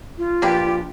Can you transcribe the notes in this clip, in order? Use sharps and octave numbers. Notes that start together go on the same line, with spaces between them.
F4
A#1 A#3 D4 G4 B4